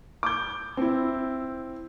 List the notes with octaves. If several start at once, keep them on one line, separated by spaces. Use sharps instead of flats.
D6 G6
C4 E4